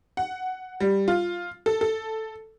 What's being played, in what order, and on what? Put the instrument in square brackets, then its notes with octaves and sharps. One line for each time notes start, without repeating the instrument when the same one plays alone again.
[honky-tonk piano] F#5
G3
F4
A4
A4